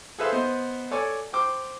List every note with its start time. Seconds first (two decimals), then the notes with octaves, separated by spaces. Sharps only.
0.18 G#4 A4 B4 C5 E5 F5
0.32 B3 C5 D#5
0.91 A4 C#5 D5 G#5
1.33 C5 G5 D6